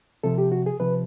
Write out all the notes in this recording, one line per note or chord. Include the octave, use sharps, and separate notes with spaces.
C3 F3 A4
G4
F#4
G#4
C3 F3 B4